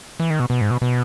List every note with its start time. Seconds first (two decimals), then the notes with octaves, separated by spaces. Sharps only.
0.20 E3
0.30 D#3
0.40 B2
0.50 B2
0.61 G#2
0.71 B2
0.82 B2